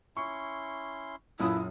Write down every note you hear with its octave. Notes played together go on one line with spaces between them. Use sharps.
C#4 E4 C6 C#6
A#1 F#2 E4 A4 B4 D#6